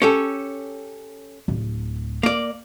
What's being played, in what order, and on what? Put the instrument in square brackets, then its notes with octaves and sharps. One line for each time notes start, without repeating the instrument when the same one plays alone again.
[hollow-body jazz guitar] C#4 G4 A4
[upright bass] D1
[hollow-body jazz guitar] A#3 D5